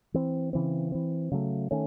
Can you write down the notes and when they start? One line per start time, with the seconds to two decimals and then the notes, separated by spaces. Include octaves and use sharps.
0.14 E3 C4
0.53 C#3 E3 C4
0.92 E3 C4
1.31 C#3 F#3 A3
1.71 D#3 A3 C#4